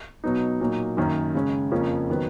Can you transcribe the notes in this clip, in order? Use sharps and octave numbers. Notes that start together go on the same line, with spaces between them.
B2 F#3 B3 D#4
A#2 F#3 A#3 D#4
F#2 D#3 A#3 C#4
C#3 G#3 C#4
F2 C#3 F3 A#3 C#4
D#3 F#3 B3